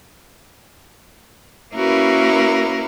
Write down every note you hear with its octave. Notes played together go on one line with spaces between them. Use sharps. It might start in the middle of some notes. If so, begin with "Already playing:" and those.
A#3 C#4 E4 F#4 A#4 B4